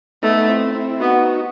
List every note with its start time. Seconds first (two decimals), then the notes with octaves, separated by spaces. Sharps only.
0.22 A3 B3 D#4
0.49 C4 E4
0.75 C4 E4
1.00 B3 D#4 F#4